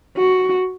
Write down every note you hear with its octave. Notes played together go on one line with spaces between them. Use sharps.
F#4